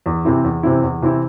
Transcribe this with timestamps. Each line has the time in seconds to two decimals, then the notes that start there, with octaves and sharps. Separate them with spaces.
0.06 E2
0.25 C3 E3 C4 E4
0.44 E2
0.63 C3 E3 C4 E4
0.83 E2
1.02 C3 E3 C4 E4